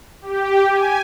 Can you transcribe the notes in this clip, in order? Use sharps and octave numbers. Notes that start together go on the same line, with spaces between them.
G4
G#5